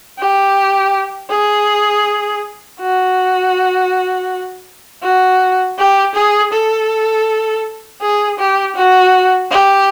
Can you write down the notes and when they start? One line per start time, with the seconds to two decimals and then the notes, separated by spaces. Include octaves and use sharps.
0.19 G4
1.30 G#4
2.81 F#4
5.03 F#4
5.79 G4
6.15 G#4
6.53 A4
8.02 G#4
8.39 G4
8.76 F#4
9.51 G4